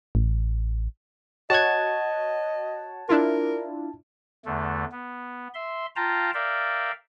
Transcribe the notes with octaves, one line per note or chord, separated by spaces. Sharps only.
A1
F#4 C#5 D#5 F#5 A5 G#6
D4 E4 F4 A#4
E2 D3 A3
B3
E5 C6
F4 F5 G5 A5 A#5
A#4 D5 E5 F5 G5